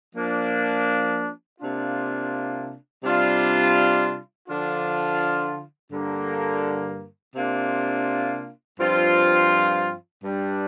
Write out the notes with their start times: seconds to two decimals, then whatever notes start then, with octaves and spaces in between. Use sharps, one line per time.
0.15 F3 A#3 D4
1.59 C3 A#3 D4 F4
3.03 C3 G3 D4 F4
4.48 D3 F3 D4 F4
5.92 G2 D3 A#3
7.36 C3 A#3 D4 F4
8.80 G2 F3 C4 F4
10.24 G2 G3 D4